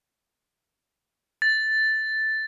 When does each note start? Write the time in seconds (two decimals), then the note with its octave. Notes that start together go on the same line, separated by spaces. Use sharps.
1.42 A6